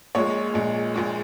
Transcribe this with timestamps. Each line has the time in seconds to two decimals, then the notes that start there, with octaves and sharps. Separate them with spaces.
0.15 A#1 A#2 G#3 C#5
0.54 A#1 A#2 G#3
0.94 A#1 A#2 G#3